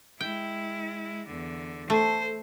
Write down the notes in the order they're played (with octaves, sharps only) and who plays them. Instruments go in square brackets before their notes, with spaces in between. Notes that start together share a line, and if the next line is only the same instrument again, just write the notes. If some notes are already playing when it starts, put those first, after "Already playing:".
[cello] G#3 E4 [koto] G5
[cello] E2 D3
[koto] A3 [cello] C5